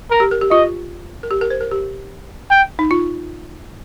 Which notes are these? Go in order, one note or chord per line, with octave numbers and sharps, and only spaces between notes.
A#4
G4
A#4
G4
F4 D#5
A#4
G4
A#4
C5
A#4
G4
G5
D#4
F4